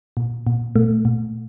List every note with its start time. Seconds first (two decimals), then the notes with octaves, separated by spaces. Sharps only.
0.17 A#2
0.47 A#2
0.76 A#2 A3
1.05 A#2